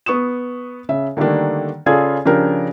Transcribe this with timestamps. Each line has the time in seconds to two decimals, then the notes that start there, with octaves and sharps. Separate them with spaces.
0.06 B3 C#6 D#6 E7
0.89 C#3 E5
1.17 D3 D#3 G3 A3 A#3 D4
1.86 C#3 F4 G#4 A4 D5 G#6
2.25 C#3 F3 D4 G4 A#4